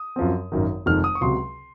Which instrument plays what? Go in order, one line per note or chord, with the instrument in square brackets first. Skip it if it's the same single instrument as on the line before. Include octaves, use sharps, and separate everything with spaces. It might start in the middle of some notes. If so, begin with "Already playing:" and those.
Already playing: [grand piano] D#6
F#2 F3 C4
G#1 F#2 D#3
F1 F2 D#3 G#3 F6
D#6
C#6
C#2 C3 F#3 C6